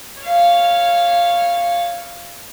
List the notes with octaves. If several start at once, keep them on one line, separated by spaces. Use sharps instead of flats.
C#5 F5